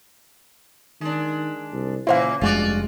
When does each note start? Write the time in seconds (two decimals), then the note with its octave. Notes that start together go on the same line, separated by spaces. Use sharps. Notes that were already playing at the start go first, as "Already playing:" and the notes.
1.01 D#3 G#3 D4
1.72 C2
2.07 A#2 C#3 E3 A#3 E4 C5 F5
2.41 F1 G2 G#3 F4 F#4 D5